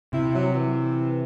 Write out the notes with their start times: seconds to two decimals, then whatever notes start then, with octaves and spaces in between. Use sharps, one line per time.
0.13 C3 E4
0.35 F#3
0.54 E3